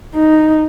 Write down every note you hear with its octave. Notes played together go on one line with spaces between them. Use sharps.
D#4